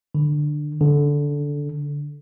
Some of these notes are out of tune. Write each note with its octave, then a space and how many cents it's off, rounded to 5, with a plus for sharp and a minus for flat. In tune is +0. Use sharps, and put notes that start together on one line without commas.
D3 +15
D3 -15